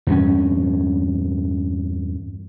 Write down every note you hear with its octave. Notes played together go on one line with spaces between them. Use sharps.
E2 G2 A3 C#4